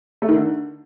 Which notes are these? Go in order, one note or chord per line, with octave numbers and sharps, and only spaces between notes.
A3
D#3
D3